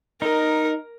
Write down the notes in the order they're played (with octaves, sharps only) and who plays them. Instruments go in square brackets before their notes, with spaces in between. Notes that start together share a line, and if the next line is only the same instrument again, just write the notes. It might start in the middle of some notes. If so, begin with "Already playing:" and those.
[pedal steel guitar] D#4 [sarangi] A#4